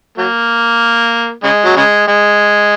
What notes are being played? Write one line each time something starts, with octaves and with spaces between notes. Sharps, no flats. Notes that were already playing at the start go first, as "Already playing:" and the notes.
F#3 A#3
C#3 G#3
F#3
C#3 G#3
G#3